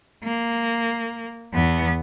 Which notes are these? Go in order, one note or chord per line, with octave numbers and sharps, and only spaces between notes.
A#3
E2 B3